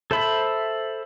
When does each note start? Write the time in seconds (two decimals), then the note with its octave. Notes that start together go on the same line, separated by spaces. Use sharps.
0.11 A4 C5 E5 B5